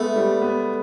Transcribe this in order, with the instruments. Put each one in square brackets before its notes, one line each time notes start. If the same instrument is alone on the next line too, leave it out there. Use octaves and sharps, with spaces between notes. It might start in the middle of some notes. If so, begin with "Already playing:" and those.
Already playing: [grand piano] G#3 B3 [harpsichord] A3
[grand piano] G3
B3